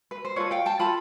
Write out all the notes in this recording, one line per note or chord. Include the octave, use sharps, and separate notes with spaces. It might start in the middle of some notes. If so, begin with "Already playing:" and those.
B4
C5
F4 A4 B4 C#5
F5 G5
G5 A5
F4 A4 A5 B5